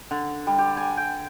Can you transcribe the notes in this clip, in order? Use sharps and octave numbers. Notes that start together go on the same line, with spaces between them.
D3
G3
G4
G#5
G5